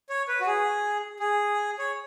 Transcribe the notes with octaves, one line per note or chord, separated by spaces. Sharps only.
C#5
B4
F#4
G#4
G#4
C#5